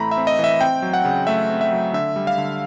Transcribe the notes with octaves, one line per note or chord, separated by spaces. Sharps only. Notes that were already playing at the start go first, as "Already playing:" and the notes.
Already playing: A2 E3 A3 C4 A#5 B5
E5
C4
D#5
E3
E5
C4 G5
F#3
F#5
C#3
A3 E5
C4
E5
F#3
D3 E5
G3
F5
D3